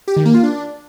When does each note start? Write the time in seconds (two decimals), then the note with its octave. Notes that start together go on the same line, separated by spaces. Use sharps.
0.08 G4
0.16 D#3
0.25 A#3
0.34 F4
0.43 D4